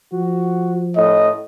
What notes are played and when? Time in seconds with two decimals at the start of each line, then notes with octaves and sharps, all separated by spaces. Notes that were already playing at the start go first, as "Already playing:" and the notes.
0.13 F3 F#4
0.96 A2 D#5